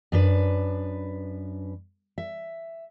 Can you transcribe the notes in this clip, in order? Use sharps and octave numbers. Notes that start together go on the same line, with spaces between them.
F#2 D4 B4
E5